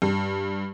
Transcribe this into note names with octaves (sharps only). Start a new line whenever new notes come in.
G2